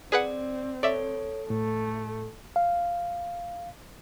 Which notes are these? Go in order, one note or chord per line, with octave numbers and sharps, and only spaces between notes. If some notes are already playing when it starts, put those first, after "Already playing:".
C4 G#4 B4 D5 F#5
A4 C#5 D5 E5
A2 A3
F5